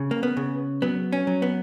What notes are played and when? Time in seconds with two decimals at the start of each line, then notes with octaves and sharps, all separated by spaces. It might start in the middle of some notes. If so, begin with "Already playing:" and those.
Already playing: C#3
0.11 A#3
0.23 B3
0.37 C#3
0.82 F#3 B3
1.12 C#4
1.27 F#3
1.42 B3